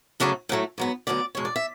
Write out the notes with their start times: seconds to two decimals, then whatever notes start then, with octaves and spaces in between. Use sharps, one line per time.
0.20 F#2 C#3 F#3 A3 D4
0.49 A2 F#3 A3
0.78 G#2 F#3 B3
1.07 D2 D3 F#3 B3 D5
1.35 E2 B2 G#3 C#5
1.45 D5
1.56 E5